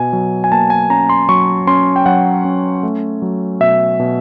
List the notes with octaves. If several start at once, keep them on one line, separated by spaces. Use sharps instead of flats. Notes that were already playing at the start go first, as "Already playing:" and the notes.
Already playing: B2 G#5
F#3
G#5
A#3 A5
G#5
C#4 A#5
C6
F#3 C#6
C#4 C6
G5
F#3 F#5
C#4
A3
F#3
B2 E5
B2